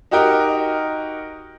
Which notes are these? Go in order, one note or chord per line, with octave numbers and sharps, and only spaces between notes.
D#4 F#4 G4 A#4 D#5